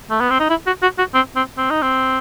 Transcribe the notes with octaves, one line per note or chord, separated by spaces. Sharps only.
A3
B3
C4
D#4
E4
F#4
F#4
F#4
C4
C4
C4
D#4
C4